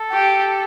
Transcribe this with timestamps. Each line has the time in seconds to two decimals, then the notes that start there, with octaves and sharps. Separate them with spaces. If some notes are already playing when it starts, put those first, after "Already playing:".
Already playing: A4
0.11 G4